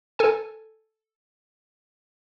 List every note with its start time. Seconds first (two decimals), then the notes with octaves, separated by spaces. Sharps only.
0.19 A4 G#5